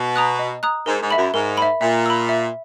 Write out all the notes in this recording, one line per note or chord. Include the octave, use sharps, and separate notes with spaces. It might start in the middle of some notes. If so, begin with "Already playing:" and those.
Already playing: B2
A#5 D#6 F#6
D#5
A#5 D#6 F#6
G#2 A#4
G#2
E5 B5
F#2
G#2 A#4
E5 B5
A#2 E5
B5 E6
E5